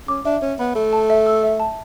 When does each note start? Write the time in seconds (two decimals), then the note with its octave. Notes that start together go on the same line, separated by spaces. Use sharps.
0.08 C#4 D6
0.25 D4 E5
0.42 C#4 C#5
0.59 B3 B5
0.75 A3 E5
0.93 A5
1.10 E5
1.27 E6
1.43 E5
1.60 A5